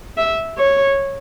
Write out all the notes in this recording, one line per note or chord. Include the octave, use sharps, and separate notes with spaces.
E5
C#5